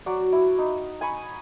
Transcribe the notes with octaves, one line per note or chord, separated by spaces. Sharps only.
F#3 F#4 D5
E4
D#4
G#5 B5 C#6